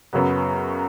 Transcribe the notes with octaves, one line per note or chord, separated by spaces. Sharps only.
F#2 C#3 F#3 B3